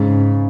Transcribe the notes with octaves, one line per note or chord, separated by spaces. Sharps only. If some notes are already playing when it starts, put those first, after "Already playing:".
Already playing: G#2 C#3